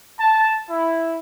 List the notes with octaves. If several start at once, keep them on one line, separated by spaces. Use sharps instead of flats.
A5
E4